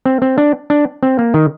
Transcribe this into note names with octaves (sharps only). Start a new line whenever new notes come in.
C4
C4
D4
D4
C4
A#3
D#3